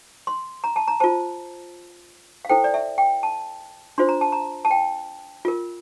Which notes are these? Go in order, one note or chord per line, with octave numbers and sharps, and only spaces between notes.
C6
A#5
A5
A#5
F4 C5 A5
F5
E4 A4 C5 G5
D5
E5
G5
A5
D4 F4 C5 C6
A#5
A5
A#5
A5
G5
F4 A#4